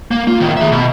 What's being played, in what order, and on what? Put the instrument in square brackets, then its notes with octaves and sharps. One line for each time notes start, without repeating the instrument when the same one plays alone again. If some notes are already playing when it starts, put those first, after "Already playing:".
[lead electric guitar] A#3
F4
A2 D#3
G#4 E5
B2